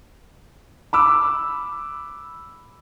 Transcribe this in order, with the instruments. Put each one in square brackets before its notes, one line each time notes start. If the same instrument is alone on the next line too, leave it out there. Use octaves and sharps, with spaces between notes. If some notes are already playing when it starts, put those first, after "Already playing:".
[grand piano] B5 D6 E6